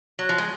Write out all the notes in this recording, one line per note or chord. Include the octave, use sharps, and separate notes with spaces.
F#3
F3
G#3